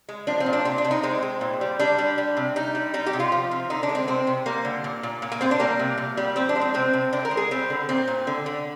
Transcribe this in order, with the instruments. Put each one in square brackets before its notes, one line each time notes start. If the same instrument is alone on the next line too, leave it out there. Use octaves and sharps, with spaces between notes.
[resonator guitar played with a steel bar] G#3
F3 D4
C4
A#2
D4
C3 C4
D4
C3
D#4
G#3 C4
G#3
A#2
G3
G3 D4
G3
G3
C3
G3 D#4
G3
G3 D#4
G4
C3
F4
F3
C3
D3 D#4
D4
G#3
C4
C3 C4
C3
G3 A#3
D3
A#2
A#2
A#2
A#3
A#2 C4
D4
G3 A#3
C3
A#2
G3
F3 C4
D4
G#3
C4
C3 C4
C3
D3 D4
A#4
G#3
G#4
G3 C4
D3
A#2 C4
A#2
D3
D3